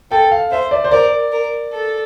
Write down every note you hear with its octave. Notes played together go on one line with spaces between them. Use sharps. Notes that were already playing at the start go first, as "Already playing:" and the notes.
A4 G5
F5
C5 E5
D5
C5
A#4 D5
A#4
A4